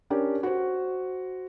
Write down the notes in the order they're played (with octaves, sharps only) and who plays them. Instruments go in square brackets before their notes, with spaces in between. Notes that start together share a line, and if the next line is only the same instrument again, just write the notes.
[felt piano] C#4 D4 G4 A#4
F#4 C5